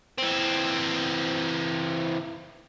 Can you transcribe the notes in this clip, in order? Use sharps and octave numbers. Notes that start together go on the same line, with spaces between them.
E3 C4